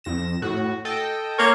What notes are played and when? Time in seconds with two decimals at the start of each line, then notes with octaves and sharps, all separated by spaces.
0.04 F2 A#6 E7
0.42 A2 F#4
0.85 A4 D#5 G5
1.39 A#3 A#4 C#5